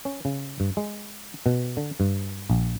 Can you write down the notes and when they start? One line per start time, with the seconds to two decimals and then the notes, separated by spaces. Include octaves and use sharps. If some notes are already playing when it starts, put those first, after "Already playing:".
0.05 C#4
0.25 C#3
0.60 G2
0.77 G#3
1.46 B2
1.77 D3
2.00 G2
2.50 A#1